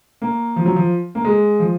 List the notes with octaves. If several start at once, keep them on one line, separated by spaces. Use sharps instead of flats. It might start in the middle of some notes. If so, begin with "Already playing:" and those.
A#3
F3
F#3
F3
A#3
G#3
F3